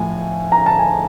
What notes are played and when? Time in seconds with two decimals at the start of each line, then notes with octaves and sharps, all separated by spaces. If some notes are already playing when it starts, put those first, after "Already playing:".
Already playing: A2 F3 G#5
0.52 A#5
0.66 A5
0.79 G#5